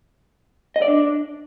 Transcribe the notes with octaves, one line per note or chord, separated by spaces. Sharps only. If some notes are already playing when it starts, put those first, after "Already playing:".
D#5
D5
D4